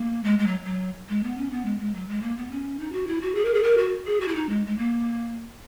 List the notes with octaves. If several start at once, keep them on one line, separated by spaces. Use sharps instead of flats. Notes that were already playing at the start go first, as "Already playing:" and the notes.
Already playing: A#3
G#3
G#3
F#3
F#3
G#3
B3
C#4
B3
G#3
G#3
F#3
G#3
A#3
B3
C#4
D#4
F#4
E4
F#4
G#4
A#4
G#4
A#4
F#4
G#4
F#4
E4
D#4
G#3
G#3
A#3